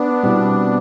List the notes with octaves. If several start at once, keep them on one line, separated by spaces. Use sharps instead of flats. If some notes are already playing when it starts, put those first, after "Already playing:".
Already playing: B3 D4
B2 G3 C4 E4